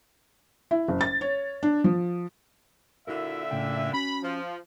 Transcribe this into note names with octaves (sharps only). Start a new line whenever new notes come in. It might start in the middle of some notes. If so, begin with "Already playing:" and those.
E4
F#1
A6
C#5
D4
F3
A#2 D3 E4 F#4 A#4 E5
A2 C#3 G5
C#4 F#4 B5
F3